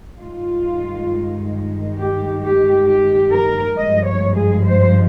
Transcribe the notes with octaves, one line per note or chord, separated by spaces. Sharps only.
G2 D#3 G#3 F4
G4
G4
G4
A#4
G2 F3 G#3 D#5
C#5
G#4
C5